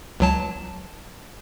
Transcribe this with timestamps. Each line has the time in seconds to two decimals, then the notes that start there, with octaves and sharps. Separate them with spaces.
0.20 C#2 F#3 A5